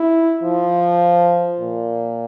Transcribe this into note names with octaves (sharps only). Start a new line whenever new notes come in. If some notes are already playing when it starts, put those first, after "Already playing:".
Already playing: E4
F3
A#2